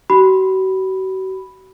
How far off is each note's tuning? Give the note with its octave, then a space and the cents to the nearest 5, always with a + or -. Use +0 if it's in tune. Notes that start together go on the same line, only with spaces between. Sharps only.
F#4 +40 B5 +0